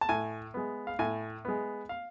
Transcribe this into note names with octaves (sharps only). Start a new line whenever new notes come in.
A5
A2 G#5
G#3 B3
F5
A2 G#5
G#3 B3
F5